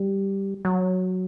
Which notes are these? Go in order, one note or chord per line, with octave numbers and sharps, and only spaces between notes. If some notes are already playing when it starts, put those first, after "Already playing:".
Already playing: G3
F#3